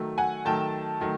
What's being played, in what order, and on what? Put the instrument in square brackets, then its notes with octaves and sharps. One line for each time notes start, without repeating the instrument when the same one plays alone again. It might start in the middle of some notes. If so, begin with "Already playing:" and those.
Already playing: [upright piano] D#3 F#3 A3
F#5 G#5
D#3 F#3 A3 G5 A5
D#3 F#3 A3